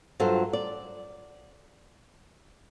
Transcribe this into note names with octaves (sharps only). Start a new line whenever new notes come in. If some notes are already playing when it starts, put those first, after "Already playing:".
G2 F#3 F4 A4 C5
D5